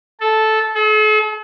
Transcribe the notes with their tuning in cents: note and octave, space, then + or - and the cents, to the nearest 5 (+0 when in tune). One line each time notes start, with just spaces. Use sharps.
A4 -10
A4 -45